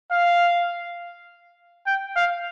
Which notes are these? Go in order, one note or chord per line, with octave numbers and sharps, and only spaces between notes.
F5
G5
F5